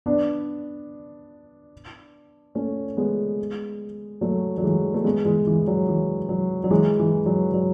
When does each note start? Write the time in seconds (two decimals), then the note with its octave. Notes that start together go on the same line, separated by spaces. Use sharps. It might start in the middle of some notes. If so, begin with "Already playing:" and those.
0.06 B3 D4
2.55 A3 C#4
2.97 G#3 B3
4.21 F#3 A3
4.58 F#3
4.63 E3 G#3
4.94 A3
5.04 G#3 B3
5.25 E3 G#3
5.47 E3
5.67 F#3
5.88 E3
6.29 F#3
6.64 F#3
6.71 E3 G#3
6.99 E3
7.26 F#3
7.54 F#3